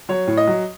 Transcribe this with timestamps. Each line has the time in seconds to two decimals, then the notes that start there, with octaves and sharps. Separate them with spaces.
0.09 F#3 C#5
0.27 A2
0.37 D#5
0.47 F#3